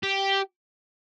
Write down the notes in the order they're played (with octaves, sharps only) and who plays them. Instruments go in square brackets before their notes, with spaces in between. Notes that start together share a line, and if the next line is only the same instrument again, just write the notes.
[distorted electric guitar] G4